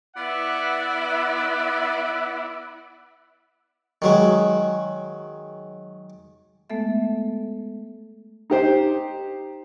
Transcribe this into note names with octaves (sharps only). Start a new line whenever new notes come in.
B3 E4 B4 D5 E5 F#5
D#3 F#3 G#3
G#3 A3 B3 A4 E5
D#4 G4 C5